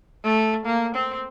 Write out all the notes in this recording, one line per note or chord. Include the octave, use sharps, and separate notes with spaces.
A3
A#3
C4